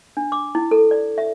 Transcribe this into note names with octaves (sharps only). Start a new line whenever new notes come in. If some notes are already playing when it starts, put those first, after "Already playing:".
D4
D6
E4
A4
D5
E5